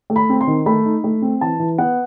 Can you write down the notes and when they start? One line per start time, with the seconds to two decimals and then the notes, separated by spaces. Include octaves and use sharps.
0.10 A3
0.16 B5
0.29 C4
0.41 C6
0.47 D#3
0.66 A3 B5
0.85 D#4
1.04 A3
1.22 C4
1.41 E3 A5
1.60 E3
1.78 B3 F#5